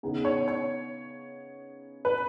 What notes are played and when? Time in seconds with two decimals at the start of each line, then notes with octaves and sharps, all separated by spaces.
0.03 C#3 B3 D#4 G#4
0.25 C#5
0.48 C#5
2.05 B4